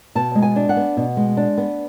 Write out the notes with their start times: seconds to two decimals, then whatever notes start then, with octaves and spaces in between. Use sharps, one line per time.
0.15 B2 A5
0.35 G#3
0.42 G#5
0.56 D4
0.69 F#5
0.77 B3
0.97 B2
1.17 G#3
1.37 D4
1.58 B3